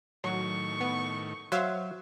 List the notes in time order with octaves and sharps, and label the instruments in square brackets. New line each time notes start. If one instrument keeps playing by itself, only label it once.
[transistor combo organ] A2 D#3 [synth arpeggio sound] F#3 [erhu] C#6
[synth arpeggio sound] B3
[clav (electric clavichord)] F#3 [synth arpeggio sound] C5 E5 F5